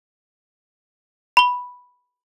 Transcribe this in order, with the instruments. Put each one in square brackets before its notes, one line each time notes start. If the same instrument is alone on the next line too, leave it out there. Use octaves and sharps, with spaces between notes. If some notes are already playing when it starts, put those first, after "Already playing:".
[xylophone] B5 G7